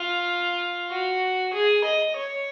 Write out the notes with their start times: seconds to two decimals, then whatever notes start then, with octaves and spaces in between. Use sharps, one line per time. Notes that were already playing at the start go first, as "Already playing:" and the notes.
Already playing: F4
0.91 F#4
1.53 G#4
1.85 D#5
2.16 C#5